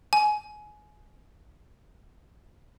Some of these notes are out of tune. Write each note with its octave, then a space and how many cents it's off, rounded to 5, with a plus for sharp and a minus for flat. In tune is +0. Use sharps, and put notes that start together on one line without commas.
G#5 +25